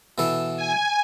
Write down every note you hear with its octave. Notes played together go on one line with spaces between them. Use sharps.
B2 E3 A4
G#5